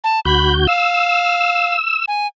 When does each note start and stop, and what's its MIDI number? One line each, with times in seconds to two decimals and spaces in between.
0.04 0.20 81
0.25 0.67 38
0.25 0.67 66
0.25 0.52 83
0.25 0.67 91
0.67 1.76 77
0.67 2.05 88
2.08 2.27 80